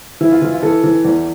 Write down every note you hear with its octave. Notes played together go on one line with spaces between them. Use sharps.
E3 E4
F4
E3 F4
F4
E3 A4
E3
E2